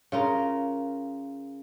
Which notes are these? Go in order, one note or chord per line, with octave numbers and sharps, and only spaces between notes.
C#3 F4 A#4